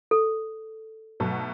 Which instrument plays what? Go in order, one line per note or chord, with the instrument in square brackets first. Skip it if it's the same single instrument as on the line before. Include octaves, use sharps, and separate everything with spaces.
[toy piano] A4
[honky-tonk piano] B1 B2 F#3 A3